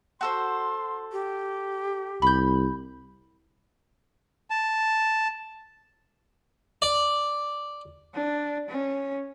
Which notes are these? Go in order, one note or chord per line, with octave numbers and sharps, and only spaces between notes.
F#4 A4 C5 C6
G4
C2 B5 G6
A5
D5
D4
C#4